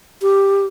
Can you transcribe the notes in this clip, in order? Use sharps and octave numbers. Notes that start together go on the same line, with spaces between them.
G4